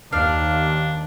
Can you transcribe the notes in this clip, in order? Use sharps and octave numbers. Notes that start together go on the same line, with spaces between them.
D#2 D4 F5